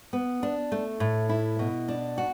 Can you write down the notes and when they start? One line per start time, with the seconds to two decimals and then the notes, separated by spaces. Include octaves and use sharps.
0.13 B3
0.43 D4
0.72 A3
1.00 A2
1.29 E4
1.59 B2
1.88 D4
2.18 F#4